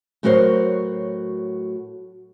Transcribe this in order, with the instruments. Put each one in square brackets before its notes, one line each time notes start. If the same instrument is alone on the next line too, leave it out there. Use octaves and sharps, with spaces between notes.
[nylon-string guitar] A2 F#3 F#4 A#4 C5 C#5